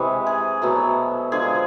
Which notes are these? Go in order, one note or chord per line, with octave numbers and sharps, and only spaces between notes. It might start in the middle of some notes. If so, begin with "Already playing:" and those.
Already playing: C3 E3 G#3
G#4
B2 F#3 A3
D3 F3 G#3 G#4